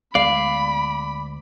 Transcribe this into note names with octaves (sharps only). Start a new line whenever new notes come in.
D2 G#3 B3 D5 F5 B5